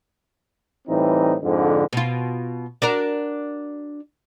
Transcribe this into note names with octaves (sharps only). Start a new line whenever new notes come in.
A2 E3 G3 C4 D#4
F2 G#2 D3
B2 F4
D4 F#4 A#4